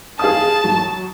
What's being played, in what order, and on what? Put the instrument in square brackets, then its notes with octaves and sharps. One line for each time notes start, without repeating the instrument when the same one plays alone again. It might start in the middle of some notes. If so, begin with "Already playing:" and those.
[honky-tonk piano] G#4 F5 D#6 [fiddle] A5
[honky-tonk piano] F#3